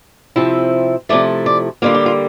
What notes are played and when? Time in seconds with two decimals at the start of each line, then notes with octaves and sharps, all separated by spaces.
0.36 C3 F3 C4 E4
1.09 C3 F3 A3 E4 D5
1.46 D5
1.82 D3 G3 A#3 F4
1.94 G4
2.06 F4